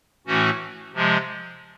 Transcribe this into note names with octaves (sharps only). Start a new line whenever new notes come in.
A2 E3 A3 C#4 F#4
C3 F3 G#3